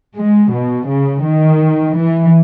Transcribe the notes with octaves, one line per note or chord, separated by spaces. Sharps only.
G#3
B2
C#3
D#3
E3